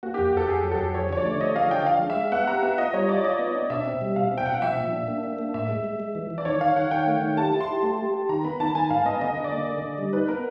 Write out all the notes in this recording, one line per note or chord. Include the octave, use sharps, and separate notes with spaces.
A#3 F#4
G4
F2
F2 A4
F2 G#4
F#3
A4
F2
F3 C#5
D3 C#5
D5
A3
F3 D#5
D3 F5
F3 G5
D4 F5
G#3
E5
G#3
B3 F#5
G4 A#5
B3 E5
F4 D#5
G3 C#5
F4 D5
F4 D#5
B3
D4
B2 E5
C4
G3
B2 F5
C4
G5
B2 F#5
F5
F3 E5
A#2
D4
A#3
D4
A#3
A2 E5
G#3
G#3
G#3
E3
E3
D5
D#3 C#5
D#3 F5
D#3 F#5
D#3 G5
A3
D#3
G4 A5
E4
C6
G4
A3 A5
G4
G4
D#3 A#5
B3 B5
D#3 A5
D#3 G#5
G#2 F5
B3 D#5
D3 D#5
D3
D5
A#3
D3
D3
G3
D#4 B4
B3 A#4